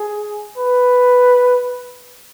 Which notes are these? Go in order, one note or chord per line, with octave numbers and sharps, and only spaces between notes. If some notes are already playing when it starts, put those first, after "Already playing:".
Already playing: G#4
B4